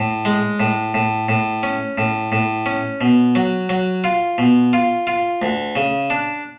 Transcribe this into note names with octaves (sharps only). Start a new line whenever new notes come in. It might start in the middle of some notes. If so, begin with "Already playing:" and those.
Already playing: A2
G#3
A2
A2
A2
C#4
A2
A2
C#4
B2
F#3
F#3
F4
B2
F4
F4
D2
C#3
D4